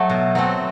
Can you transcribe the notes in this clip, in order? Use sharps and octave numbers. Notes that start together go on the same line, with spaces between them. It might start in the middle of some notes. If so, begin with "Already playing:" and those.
Already playing: F#3 A3 A4
B2
F#3 A3 C4